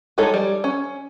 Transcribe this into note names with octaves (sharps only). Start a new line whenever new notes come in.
G3 G#3 D#4 A4 C#5
G3
C#4